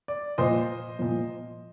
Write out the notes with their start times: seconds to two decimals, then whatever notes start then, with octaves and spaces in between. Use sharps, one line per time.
0.08 D5
0.38 A#2 F3 C5 D#5
0.99 A#2 F3